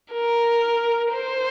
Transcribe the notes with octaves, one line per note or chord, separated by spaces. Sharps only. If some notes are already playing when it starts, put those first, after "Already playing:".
A#4
C5